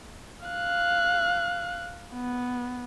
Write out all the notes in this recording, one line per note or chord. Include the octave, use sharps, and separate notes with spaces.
F5 F#6
B3